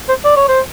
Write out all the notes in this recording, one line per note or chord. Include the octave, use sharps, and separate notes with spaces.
C5
D5
C#5
C5